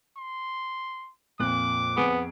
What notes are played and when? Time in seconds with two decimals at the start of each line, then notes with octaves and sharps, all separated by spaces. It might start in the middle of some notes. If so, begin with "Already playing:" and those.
0.17 C6
1.40 F2 A#2 D6 F#6
1.97 F2 B3 G#4 D7